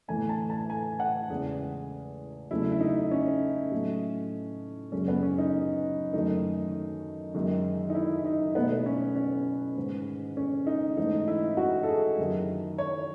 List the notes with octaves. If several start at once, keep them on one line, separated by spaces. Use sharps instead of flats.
A2 E3 A3 G#5
A5
A5
G#5
F#5
E2 C#3 G#3 G#4
E2 C#3 F#3 A3 E4
E4
D#4
C#4
A2 F#3 A3
F#2 C#3 G#3 C#4
B3
C#4
D#4
F#2 D#3 A3 D#4
F#2 D#3 G#3
D#4
E4
D#4
B2 A3 B3
B3
C#4
C#4
G#2 D#3 G#3
C#4
D#4
G#2 E3 A3 D#4
E4
F#4
A4
G#4
F#2 D#3 F#3
C#5